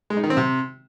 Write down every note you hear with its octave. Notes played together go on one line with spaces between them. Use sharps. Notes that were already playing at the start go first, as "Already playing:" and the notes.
G#3
D#4
D#3
C4
C3